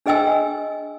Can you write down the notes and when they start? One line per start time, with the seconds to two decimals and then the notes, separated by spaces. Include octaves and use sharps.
0.06 D4 G#4 D#5 G5 G#5 E6